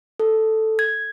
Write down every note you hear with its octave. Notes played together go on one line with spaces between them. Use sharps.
A4
G#6